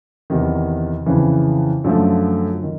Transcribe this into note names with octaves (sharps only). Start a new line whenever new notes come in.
E2 C3 D#3
F2 C#3 E3
F#2 D3 F3 A3
D#3